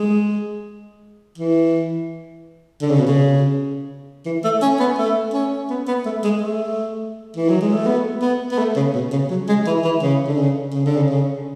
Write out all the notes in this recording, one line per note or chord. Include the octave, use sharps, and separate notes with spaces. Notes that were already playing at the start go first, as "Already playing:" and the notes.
Already playing: G#3
E3
D3
C#3
B2
C#3
E3
A3
C#4
B3
A3
C#4
B3
B3
A3
G#3
A3
E3
F#3
G#3
A3
B3
B3
B3
A3
C#3
B2
C#3
F#3
G#3
E3
E3
C#3
D3
C#3
C#3
D3
C#3
C#3